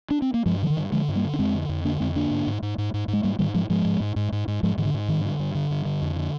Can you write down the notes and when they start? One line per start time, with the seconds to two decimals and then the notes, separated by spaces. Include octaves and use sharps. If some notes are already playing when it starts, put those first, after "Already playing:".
0.11 D4
0.22 C4
0.34 A#3
0.46 G2 F3 G#3
0.62 D3 F3
0.70 D#3
0.77 G2
0.92 D3 F3 G#3
1.08 G2
1.16 G3 A#3
1.24 D3
1.34 D4
1.39 F2 G#3 C4
1.54 D3
1.69 F2
1.84 D3 A#3 D4
2.00 F2 G#3 C4
2.15 D3 A#3 D4
2.31 G#2
2.47 G#2
2.62 G#2
2.78 G#2
2.94 G#2
3.08 G#2
3.13 G#3
3.23 G#2 G3 A#3
3.39 G#2 D#3 G3
3.54 G#2 F3 G#3
3.70 G#2 F3 G#3
3.85 G#2
4.00 G#2
4.16 G#2
4.32 G#2
4.48 G#2
4.63 G#2 F3 G#3
4.77 G#2 D#3
4.85 D3
4.94 G#2
5.08 G2 D#3
5.25 D3
5.39 G2
5.55 D3
5.70 G2
5.85 D3
6.02 F2
6.16 D3